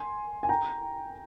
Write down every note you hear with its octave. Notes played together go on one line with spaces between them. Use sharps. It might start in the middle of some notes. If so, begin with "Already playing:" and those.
Already playing: G#5 C6
G#5
G5 A#5